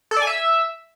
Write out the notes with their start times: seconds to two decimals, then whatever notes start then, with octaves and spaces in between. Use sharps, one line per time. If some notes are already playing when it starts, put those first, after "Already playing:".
0.11 A4
0.16 D5
0.22 G#5
0.27 E5